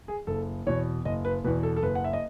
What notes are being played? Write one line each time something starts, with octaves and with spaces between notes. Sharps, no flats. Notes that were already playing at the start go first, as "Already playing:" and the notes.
G#4
F#1 A4
E2 B2 C#5
F#1 D#5
B4
E2 B2 B4
A4
A4
F#1 B4
F#5
E5
D#5